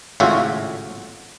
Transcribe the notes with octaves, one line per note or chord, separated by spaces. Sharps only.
G#1 A2 C#3 F4 F#4 E5